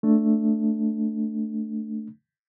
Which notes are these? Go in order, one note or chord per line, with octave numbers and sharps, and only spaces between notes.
A3 D4